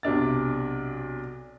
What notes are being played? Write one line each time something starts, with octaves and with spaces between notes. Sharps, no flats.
B1 C3 D4 A6